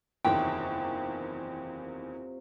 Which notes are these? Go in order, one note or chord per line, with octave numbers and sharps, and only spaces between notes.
F#1 E2 C3 D#3 F#3 F4 G5